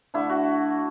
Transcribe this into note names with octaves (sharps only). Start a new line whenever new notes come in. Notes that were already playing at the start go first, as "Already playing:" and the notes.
D3 A3 D4 E4
F#4